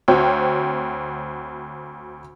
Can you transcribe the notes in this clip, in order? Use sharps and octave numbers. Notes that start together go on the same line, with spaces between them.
D2 C4 F#4 C#5 G5